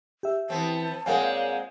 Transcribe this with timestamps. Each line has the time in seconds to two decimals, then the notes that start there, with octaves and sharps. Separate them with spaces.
0.23 G4 E5
0.50 E3 B3 C4 A5
1.06 A#2 G#3 C4 A#4 C#5 F5 F#5 G#5